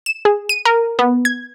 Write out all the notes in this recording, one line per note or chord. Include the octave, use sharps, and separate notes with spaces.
E7
G#4
D#7
A#4
B3
G#6